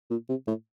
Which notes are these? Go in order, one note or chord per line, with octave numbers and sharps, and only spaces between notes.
A#2
C3
A2